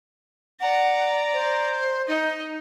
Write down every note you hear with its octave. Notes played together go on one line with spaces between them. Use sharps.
D5 F#5 A#5
C5
D#4 D#5